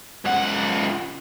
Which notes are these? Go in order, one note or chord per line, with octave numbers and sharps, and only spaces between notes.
C#2 F#5